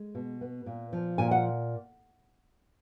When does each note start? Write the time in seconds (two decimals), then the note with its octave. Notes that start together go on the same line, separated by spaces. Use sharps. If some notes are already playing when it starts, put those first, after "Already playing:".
Already playing: G#3
0.15 B2
0.41 B3
0.66 A#2
0.93 F3
1.18 A#2 G#5
1.31 F#5